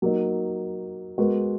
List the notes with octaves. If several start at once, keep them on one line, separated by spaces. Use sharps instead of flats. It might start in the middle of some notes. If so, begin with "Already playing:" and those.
F#3 A#3 D#4
G#3 B3 F#4 A#4